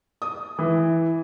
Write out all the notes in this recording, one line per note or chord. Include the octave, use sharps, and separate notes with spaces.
D#6
E3